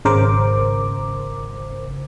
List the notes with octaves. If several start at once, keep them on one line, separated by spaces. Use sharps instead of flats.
G#1 C#3 A#4 C5 D6